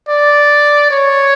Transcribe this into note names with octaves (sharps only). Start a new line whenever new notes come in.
D5
C#5